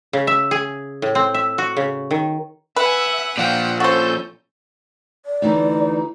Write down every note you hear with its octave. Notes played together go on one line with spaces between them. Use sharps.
C#3
E5
G#4
A2
C4
E5
F#4
C#3
D#3
B4 E5 F#5 G#5
A#2 F3 F#5 G5
C#4 F#4 A4 C5 G6
D5
D2 E3 D#4